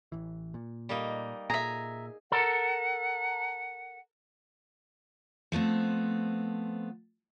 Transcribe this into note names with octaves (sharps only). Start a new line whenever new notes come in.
A1 E3
A#2
G3 A#3 D#4
A#2 G#4 E5 A#5
A4 A#4 F#5
F3 A3 B3 C4